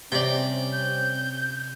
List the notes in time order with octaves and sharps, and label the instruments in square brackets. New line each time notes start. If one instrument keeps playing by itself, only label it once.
[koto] C3 [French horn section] G3 C4 C#4 [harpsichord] D5 G5
[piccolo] G6